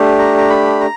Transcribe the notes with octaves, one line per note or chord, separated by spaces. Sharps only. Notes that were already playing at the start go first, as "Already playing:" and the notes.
Already playing: A3 D4 G4
A#5
A#5
B5
A#5